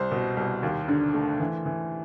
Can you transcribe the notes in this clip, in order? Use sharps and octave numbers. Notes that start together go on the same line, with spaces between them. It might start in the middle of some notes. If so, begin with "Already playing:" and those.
Already playing: C2 C5
B2
C2
D#2
D3
A3
E3
E3